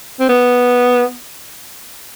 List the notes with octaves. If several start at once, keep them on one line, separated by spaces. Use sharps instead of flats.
C4
B3